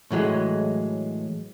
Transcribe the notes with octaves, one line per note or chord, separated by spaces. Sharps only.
A2 E3 F#3 G#3